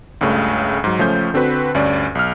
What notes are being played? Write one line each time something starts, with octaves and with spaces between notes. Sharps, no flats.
C#2 G2 C#3 A3
G#2 F#3
C#2 F3 A3 C#4 G6
D3 C4 F#4 B4
D2 G2 C#4 D5
B1 F6